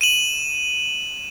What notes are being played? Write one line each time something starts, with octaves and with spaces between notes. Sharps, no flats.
D#7 E7 F#7